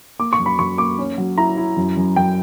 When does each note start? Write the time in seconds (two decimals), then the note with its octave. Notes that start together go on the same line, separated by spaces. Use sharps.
0.19 A#3 D6
0.33 C#6
0.39 F#2
0.46 B5
0.59 F#2 C#6
0.78 A#3 D6
0.99 C#4
1.18 F#3
1.38 E4 A#5
1.57 E4
1.77 F#2
1.97 F#2
2.16 F#2 G5